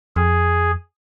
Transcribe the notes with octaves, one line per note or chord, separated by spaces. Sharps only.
F2 G#4